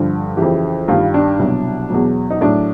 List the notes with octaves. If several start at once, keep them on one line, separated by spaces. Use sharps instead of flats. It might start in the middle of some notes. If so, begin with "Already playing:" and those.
Already playing: G2 D3 F3
F2 C#3 E3 G4
G2 D#3 G3 F4
D4
C2 B2 F#3
E2 B2 F#3
D#4
A2 F#3 D4